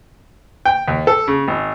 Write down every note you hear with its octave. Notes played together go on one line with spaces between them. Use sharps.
G5
D#2
A4
C#3
G#1